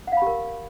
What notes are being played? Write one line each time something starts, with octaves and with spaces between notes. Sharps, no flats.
G4 A#4 F5 F#5 B5